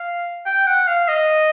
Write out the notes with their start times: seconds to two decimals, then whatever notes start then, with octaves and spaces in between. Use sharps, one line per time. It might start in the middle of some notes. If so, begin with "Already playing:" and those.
Already playing: F5
0.46 G5
0.67 F#5
0.88 F5
1.09 D#5